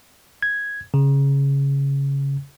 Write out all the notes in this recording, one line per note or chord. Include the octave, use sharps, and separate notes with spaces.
G#6
C#3